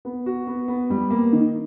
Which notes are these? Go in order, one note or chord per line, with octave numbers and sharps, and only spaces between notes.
B3
F#4
B3
B3
G3
A#3
D#3